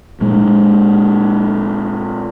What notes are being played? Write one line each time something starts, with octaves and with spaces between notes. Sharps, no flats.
A#2 G#3